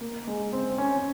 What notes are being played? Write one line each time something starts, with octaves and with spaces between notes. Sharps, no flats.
A#3
G#3
C4
C#4